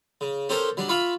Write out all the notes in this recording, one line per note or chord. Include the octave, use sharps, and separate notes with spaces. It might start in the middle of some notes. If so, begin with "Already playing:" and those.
C#3
C#4 G4 A4 A#4 C5 G5
F#3 G3 D4
F4 E5 F5 B5 C#6